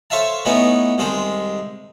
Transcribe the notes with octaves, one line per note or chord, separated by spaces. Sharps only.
A4 C5 C#5 E5 F5 A5
E3 A3 B3 C#4 D#4 E4
C2 D#3 G#3 A4 C5